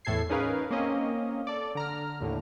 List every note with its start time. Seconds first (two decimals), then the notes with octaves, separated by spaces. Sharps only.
0.05 E2 A2 A4 G#6 C7
0.29 C#4 D#4 G#4 A#4 B4 F5
0.70 A#3 C4 C#4 D#5
1.47 A4 D5
1.75 D3 A#5 F6
2.20 D#2 A2 D3